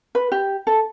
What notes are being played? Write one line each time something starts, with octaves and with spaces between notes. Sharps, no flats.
B4
G4
A4